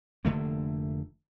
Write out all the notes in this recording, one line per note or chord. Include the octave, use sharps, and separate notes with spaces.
F1 D3 A3 A#3